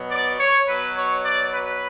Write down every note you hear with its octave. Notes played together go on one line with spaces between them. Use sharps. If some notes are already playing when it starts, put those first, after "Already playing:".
Already playing: B2 F#3
D5
C#5
B2 F#3 B4
C#5
D5
B4